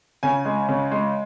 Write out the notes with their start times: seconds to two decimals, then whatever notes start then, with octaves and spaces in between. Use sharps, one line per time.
0.23 C#3 G#5
0.45 G#3
0.69 C#3
0.91 G#3